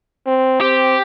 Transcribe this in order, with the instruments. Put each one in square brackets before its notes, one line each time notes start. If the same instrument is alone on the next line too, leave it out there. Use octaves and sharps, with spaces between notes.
[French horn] C4
[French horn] C4 [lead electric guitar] G4